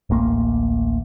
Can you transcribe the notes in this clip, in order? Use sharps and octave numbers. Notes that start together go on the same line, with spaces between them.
D1 A1 A#3